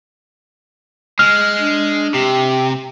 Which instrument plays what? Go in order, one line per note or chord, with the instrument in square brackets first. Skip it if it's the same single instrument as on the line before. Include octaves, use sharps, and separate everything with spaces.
[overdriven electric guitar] G#3 [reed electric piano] F6
[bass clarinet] D4
[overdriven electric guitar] C3 [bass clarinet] G4